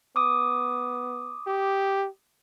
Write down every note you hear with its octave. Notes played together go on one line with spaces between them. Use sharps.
B3 D6 D#6
G4